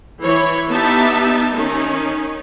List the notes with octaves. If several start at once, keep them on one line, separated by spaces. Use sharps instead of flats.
E3 C#5
B3 D#4 G4 E5 A5
D#3 C#4